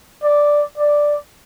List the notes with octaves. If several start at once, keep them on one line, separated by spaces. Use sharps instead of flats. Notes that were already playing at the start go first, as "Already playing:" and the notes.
D5
D5